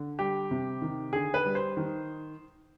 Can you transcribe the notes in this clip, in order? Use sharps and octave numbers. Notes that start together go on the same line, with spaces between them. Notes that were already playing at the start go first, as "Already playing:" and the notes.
Already playing: D3
G3 G4
C3
D#3
D3 G#4
B4
G3
C5
D#3